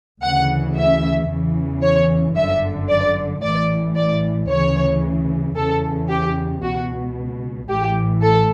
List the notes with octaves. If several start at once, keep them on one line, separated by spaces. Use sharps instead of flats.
D2 C#3 E3 F#5
E5
E2 C#3 E3
C#5
G1 F#2 D3 E5
D5
A1 A2 E3 D5
D5
D2 C#3 E3 C#5
E2 C#3 E3 A4
G4
C#2 B2 F#4
A1 A2 E3 G4
A4